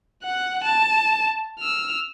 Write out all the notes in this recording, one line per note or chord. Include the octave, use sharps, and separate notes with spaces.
F#5 F#6
A5
E6 F6